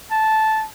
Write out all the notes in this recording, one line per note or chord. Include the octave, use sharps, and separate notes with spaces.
A5